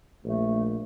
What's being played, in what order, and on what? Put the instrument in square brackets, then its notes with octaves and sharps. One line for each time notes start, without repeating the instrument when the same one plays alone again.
[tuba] A#1 [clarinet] A3